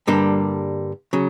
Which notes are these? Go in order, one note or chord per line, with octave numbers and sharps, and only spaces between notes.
G2 D3 G3 A#3 D4
C#3 F#3